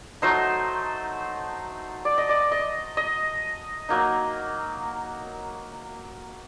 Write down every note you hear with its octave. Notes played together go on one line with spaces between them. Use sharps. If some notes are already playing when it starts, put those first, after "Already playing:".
F#3 A3 D#4 C5
D5
D#5
D5
D#5
D#5
F#3 A#3 D#4